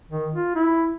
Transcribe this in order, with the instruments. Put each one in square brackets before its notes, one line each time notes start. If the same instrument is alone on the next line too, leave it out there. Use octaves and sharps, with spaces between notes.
[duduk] D#3
F4
E4